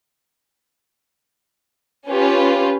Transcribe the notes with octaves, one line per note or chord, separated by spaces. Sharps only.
C#4 F4 G4 B4